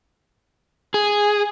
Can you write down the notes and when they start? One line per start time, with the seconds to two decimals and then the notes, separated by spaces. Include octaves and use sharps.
0.94 G#4